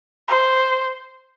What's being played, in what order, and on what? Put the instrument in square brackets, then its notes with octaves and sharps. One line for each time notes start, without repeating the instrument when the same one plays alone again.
[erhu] C5